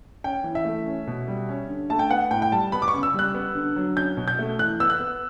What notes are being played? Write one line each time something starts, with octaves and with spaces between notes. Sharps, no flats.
C#4 G5
E3
E5
A3
C#4
B2
G3
C#4
D3
A3 A5
G5
B3 F#5
A2 G5
G5
G3 A5
B3 B5
D6
C#6
C#3
E6
G3 F#6
B3
D3
F#3
C#4 G6
B2
G6
A3
E3 F#6
B3 E6
F#6
B3